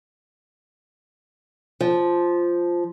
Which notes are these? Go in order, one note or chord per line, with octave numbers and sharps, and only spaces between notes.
F3